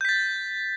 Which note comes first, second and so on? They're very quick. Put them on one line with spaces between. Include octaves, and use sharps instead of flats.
G6 B6 A6